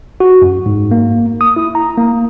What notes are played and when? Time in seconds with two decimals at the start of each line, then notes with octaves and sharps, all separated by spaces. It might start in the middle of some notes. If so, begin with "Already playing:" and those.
0.20 F#4
0.42 F#2
0.66 G#2
0.91 A#3
1.41 D#6
1.56 E4
1.75 A#5
1.97 A#3